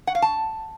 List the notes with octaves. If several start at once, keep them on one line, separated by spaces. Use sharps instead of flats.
F#5
F5
A5